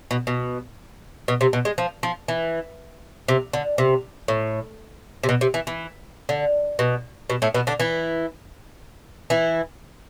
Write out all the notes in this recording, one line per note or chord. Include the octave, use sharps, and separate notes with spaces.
B2
B2
B2
C3
B2
G#3
F3
F3
E3
C3
D3
C3
A2
C3
B2
C3
E3
E3
D3
B2
B2
A2 A3
B2 B3
D3 D4
E3 E4
E3 E4